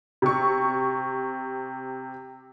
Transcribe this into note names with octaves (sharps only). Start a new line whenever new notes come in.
C3 C#6